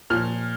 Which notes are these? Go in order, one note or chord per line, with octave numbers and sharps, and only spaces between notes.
A#2 F3 F6